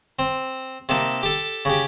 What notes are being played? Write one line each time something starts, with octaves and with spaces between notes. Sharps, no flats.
C4
C3 A#3 D#4 A5
G4 A4
C#3 G4